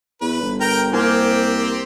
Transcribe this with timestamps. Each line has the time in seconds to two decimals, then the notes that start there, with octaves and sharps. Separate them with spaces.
0.21 E2 B4
0.41 G1
0.61 A#4 G5 A#5
0.93 C2 A#3 C4 G4 G#5 F6